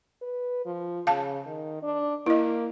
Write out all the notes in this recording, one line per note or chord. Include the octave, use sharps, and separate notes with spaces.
B4
F3
C#3 F5 A5
D#3
D4
A#3 E4 D#5